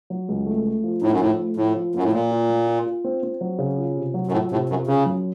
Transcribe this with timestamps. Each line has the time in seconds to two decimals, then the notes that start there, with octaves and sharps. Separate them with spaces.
0.10 F#3
0.28 C#2
0.46 A3
0.65 A3
0.84 F3
1.02 A2 D#4
1.11 F#2
1.20 A2 F3
1.39 A3
1.57 A2 F3
1.75 F3
1.94 F#2 A#3
2.03 A2
2.12 A#2 A#3
2.31 F4
2.50 A#3
2.67 F4
2.86 F4
3.04 C4
3.23 C4
3.41 F#3
3.59 C#3
3.78 F4
3.96 C3
4.14 F#3
4.27 F#2
4.32 A2 F4
4.51 A2 C3
4.69 F#2 F4
4.87 C#3 C#4
5.06 F#2